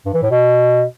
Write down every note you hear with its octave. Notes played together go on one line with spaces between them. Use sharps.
G2
E3
A2
B2